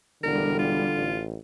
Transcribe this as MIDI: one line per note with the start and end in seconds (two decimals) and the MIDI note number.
0.23 0.88 28
0.23 1.15 50
0.23 1.09 55
0.23 0.55 70
0.59 1.22 65
0.96 1.36 33